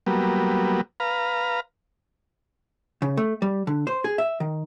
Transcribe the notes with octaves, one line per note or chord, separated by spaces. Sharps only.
F#3 G3 A#3 B3
B4 F5 A#5
C#3
A3
G3
D3
C5
G#4
E5
D#3